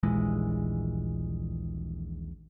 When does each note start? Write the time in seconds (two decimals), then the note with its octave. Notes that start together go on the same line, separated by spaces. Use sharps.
0.03 D#1 A#1 E3 G#3